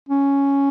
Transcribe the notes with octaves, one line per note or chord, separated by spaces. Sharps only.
C#4